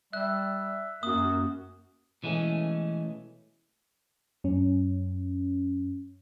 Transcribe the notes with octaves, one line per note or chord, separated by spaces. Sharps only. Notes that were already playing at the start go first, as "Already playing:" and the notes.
G3 E5 F#6
F#2 A#3 F#4 D#6
B2 E3 G#3 A3 C#4
F#2 C#4